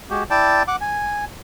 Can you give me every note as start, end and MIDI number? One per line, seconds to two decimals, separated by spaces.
0.10 0.23 56
0.10 0.23 66
0.10 0.23 67
0.30 0.63 64
0.30 0.63 74
0.30 0.63 79
0.30 0.63 81
0.68 0.76 78
0.68 0.76 86
0.81 1.25 80